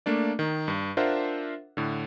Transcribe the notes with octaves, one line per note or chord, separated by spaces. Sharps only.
A3 A#3 D4 D5
D#3
G2
D4 F4 A#4 C5 E5 F#5
A2 D3